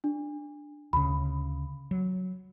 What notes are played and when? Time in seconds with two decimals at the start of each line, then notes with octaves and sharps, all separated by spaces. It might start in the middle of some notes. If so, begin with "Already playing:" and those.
0.04 D4
0.93 D2 C#3 B5
1.91 F#3